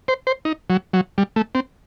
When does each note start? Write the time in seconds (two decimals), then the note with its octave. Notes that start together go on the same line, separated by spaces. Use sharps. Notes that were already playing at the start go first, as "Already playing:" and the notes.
0.08 C5
0.27 C5
0.45 D#4
0.70 F#3
0.93 F#3
1.18 G3
1.36 A3
1.55 C4